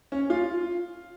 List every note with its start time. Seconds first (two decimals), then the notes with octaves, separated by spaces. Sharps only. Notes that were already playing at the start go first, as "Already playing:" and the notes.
0.12 C#4
0.30 F4